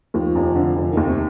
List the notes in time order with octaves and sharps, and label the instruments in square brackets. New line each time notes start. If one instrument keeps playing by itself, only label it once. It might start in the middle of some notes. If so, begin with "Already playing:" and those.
[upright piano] D#2 [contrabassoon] F3
[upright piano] F1
D3
[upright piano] F1 [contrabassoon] F3
[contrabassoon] D#3
[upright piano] D#2
[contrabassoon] C3